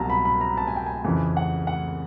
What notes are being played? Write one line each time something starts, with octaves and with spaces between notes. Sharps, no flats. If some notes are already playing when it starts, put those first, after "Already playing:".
Already playing: C2 B2 F#3 A5 A#5
B5
B5
A#5
A5
G#5
G5
G#5
F2 C#3 E3
F#5
F#5